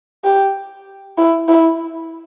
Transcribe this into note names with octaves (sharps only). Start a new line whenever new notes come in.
G4
E4
E4